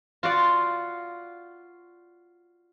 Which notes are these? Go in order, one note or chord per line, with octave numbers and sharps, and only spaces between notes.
F4 F#4 D5